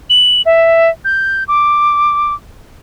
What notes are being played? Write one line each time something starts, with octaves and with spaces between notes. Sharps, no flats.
F#7
E5
G6
D6